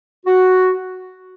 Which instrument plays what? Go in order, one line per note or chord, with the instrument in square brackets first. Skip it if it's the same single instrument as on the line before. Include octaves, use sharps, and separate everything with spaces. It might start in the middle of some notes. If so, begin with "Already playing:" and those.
[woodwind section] F#4